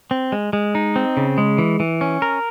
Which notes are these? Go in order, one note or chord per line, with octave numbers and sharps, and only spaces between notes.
C4
G#3
G#3
D#4
C4
C#3
G#3
E3
E3
C#4
A#4